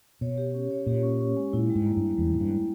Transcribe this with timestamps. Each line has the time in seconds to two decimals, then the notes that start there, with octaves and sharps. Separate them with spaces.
0.21 B2 C#5
0.38 G4
0.54 C#4
0.71 C#5
0.86 A#2 G4
1.03 C#4
1.21 C#4
1.37 G#3
1.53 A#2 E4
1.70 G3
1.75 G#2
1.86 A#3
1.96 G2
2.02 E4
2.18 E2 G3
2.33 G#2 G3
2.40 G2
2.51 G3